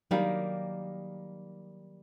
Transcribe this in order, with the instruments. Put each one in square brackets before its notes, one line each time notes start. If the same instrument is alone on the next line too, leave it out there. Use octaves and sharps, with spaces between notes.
[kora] D#3 G3 A#3 [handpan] F#3